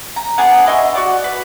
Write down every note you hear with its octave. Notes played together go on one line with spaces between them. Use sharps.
A#5
B3 D4 G#4 F#5
E4 D#5 C6 C#6
F#4 D5
B4